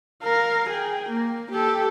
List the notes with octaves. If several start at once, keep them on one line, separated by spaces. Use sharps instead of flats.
A#4 F5
G#4 G5
A#3
G4 A4